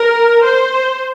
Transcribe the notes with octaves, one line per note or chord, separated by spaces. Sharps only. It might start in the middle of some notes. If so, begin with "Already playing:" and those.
Already playing: A#4
C5